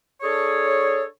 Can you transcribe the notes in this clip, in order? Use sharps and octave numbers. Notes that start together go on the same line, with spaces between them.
D4 G#4 A4 C#5